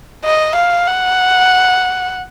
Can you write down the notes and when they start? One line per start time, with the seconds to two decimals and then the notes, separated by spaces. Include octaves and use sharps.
0.25 D#5
0.56 F5
0.87 F#5